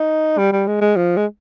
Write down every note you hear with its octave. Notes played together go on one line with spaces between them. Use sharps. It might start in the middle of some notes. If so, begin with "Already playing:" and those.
Already playing: D#4
G3
G3
G#3
G#3
F3
G#3